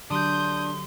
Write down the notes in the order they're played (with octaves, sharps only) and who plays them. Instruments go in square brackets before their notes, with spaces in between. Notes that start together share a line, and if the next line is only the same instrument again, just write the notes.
[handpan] D3 F#3 G4 [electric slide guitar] D4 [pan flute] C6 [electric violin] D#6 G6